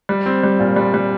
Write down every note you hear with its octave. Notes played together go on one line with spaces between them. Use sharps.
G3
C4
G3
A#2
G3
G3